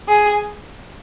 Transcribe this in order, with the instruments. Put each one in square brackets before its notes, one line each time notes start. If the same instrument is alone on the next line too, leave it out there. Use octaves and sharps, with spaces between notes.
[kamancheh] G#4